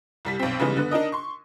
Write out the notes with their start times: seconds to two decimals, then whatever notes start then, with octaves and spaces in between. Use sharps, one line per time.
0.25 C2 G3 B6
0.39 B1 C4
0.59 C#3 E3 G3 G#3 B3 D#4
0.76 D3 B3
0.91 D4 D#4 A#4 D#5
1.12 C6 C#6